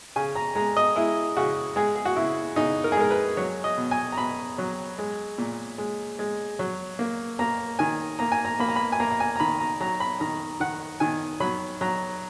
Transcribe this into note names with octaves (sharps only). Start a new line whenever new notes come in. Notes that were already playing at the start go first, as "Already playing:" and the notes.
C#3 G#5
A#5
G#3 A#5
D#5
G#3 E4
C#3 F#4
G#3 G#4
G#4
F#4
C#3 E4
C#3 D#4
A#4
G#4
G#3 A#4
B4
F#3 C#5
D#5
B2
G#5
A#5
B2 B5
F#3
G#3
A#2
G#3
G#3
F#3
A#3
A#3 A#5
D#3 G#5
A#3 A#5
G#5
A#5
A#3 B5
A#5
B5
G#5
A#3 A#5
A#5
G#5
A#5
D#3 B5
A#5
F#3 A#5
B5
D#3 A#5
D#3 F#5
D#3 G#5
F#3 B5
F#3 A#5